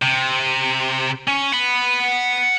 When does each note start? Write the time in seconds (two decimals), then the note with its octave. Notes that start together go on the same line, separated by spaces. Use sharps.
0.02 C3
1.28 C#4
1.52 F#5 B5